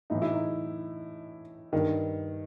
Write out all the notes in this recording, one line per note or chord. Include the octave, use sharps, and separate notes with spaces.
A2 E3 D#4
E4
D#4
G2 D#3